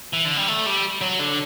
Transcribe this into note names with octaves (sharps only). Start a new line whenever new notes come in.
E3
D3
G3
A3
G3
F#3
D3